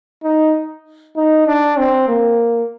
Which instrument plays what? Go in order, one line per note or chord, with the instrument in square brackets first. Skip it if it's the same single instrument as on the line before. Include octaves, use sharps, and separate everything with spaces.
[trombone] D#4
D#4
D4
C4
A#3